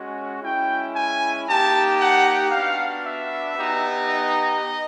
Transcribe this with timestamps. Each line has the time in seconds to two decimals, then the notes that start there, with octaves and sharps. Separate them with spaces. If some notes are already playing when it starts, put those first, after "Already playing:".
Already playing: G#3 C#4 F#4
0.42 G#3 C#4 E4 G5
0.94 G#5
1.47 A#3 D#4 G4 A5
1.99 F#5
2.52 B3 D4 F#4 F5
3.04 E5
3.56 B3 D#4 G4
4.09 D#5